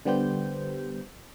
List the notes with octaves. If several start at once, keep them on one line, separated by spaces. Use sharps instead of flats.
D3 G3 B3 G4 C5 G6